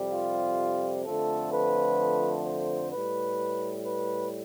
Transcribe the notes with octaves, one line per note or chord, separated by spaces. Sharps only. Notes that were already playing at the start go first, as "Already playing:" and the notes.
Already playing: F2 C3 G3
F4
F2 D3 F3 A3 A4
B4
C5
A2 G3 B4
B4